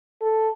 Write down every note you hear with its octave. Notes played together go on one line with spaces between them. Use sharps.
A4